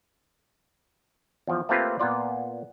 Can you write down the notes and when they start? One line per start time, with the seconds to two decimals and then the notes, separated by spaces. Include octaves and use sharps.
1.47 E2 F3
1.69 A3 A#3 C4 F4 G4 B4
1.99 A#2 B3 F4 D5